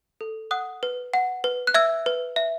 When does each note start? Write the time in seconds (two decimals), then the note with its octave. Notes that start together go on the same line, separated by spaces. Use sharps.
0.21 A4
0.51 F#5 D#6 F#6
0.83 B4
1.14 F#5
1.44 B4
1.67 F#6
1.74 E5 E6 G#6
2.06 B4
2.36 E5